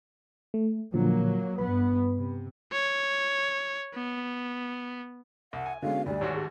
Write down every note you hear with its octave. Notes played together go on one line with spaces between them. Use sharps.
A3
A#2 D3 F3 F#3 A#3
G2 B3 B4 B5
C3
C#5
B3
C2 E5 F#5
G#5
D3 G#3 B3 C#4 F#4 F5
D2 G3 D5
A1 G#2 D#3 F#4 G4 C#5 A5
G#4